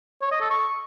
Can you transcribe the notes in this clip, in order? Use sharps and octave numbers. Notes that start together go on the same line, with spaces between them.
C#5
D#5
A4
C#6